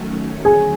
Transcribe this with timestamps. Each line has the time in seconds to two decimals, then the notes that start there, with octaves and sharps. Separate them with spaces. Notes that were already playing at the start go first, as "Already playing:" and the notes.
Already playing: D#3 F#3 A3 C#4
0.44 D3 F#3 G#4 G#5